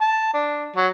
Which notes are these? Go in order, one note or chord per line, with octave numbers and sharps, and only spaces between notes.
A5
D4
F#3